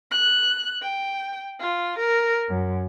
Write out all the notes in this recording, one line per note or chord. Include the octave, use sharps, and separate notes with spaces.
F#6
G5
F4
A#4
F#2